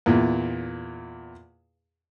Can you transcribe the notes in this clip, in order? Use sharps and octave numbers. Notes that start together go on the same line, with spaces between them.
E2 A#2